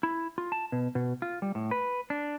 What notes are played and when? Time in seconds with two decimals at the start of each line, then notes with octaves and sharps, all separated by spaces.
0.03 E4
0.38 F4
0.52 A5
0.72 B2
0.95 B2
1.22 F4
1.42 G3
1.55 A2
1.71 B4
2.10 D4